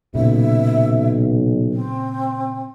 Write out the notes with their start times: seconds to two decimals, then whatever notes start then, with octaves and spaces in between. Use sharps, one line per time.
0.15 B1 A#2 C#3 E5
1.72 C4